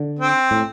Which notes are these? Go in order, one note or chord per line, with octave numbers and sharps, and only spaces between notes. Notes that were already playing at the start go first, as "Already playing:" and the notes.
Already playing: D3
C4
A2